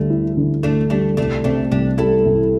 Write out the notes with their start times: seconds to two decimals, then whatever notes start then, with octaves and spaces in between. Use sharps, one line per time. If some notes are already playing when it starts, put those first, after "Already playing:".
Already playing: D2 D3 G3 A3 D4
0.10 E4
0.37 D3
0.63 D2 A3 D4
0.90 G3 A3 D4
1.17 C2 A3 D4
1.44 C3 A3 D4
1.72 C2 D4 G4
1.98 G3 E4 A4
2.26 C2